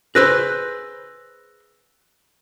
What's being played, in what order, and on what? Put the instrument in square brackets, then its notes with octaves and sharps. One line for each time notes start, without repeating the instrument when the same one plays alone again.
[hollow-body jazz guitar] G#4 B4 C5 [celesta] E6 F#6 A#6